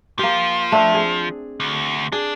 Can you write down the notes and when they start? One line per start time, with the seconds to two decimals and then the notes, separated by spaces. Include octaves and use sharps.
0.19 F3 A#3 G4
0.72 A3 C4 D4
0.94 G#4
1.60 D2
2.12 D4 G#4